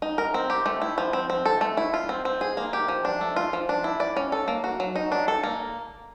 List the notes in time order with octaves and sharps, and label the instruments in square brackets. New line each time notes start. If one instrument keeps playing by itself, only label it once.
[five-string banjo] D#4
A#4
C4
G4
A3
E4
F3
C4
C4
A4
A3
E4
F4
C4
C4
G#4
A#3
G4
F3
D4
A3
F4
F3
D4
E4
D5
C#4
A4
A#3
F#4
F#3
D#4
D4
A4
A#3